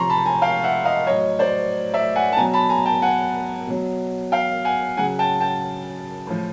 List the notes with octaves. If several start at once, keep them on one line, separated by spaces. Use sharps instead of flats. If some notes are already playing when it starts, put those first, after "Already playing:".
Already playing: C3 F3 A#5 C6 C#6
A5 B5
G#5 A#5
F5 G5
E5 F#5
D#5 F5
A2 F#3 C#5 D#5
C5 D5
D5 E5
F#5 G#5
A5
B2 F#3 G#5 A#5
A5 B5
G#5 A#5
G5 A5
F#5 G#5
B2 F#3
F5 G5
F#5 G#5
C#3 F#3 F#5 G#5
G5 A5
G5 A5
A2 F3